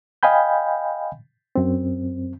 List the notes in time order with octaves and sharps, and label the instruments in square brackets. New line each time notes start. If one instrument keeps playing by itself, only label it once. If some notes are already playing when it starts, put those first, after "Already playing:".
[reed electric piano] D#5 F5 G5 G#5 B5 G6
F#2 C4